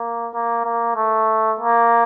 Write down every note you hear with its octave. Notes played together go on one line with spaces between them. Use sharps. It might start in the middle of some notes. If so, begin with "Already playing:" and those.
Already playing: A#3
A#3
A#3
A3
A#3